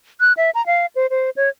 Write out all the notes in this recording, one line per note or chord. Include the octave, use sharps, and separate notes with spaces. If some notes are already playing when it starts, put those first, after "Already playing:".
F#6
E5
A#5
F5
C5
C5
C#5